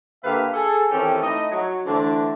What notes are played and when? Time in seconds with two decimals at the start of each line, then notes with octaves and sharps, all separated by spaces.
0.24 D3 A#3 G4 B4 E5 F5
0.54 G#4 A4
0.90 D#3 E3 C4 C#4 G4 A4
1.22 A3 D#4 E4 D#5
1.51 F#3
1.86 D3 E3 A3 C4 D4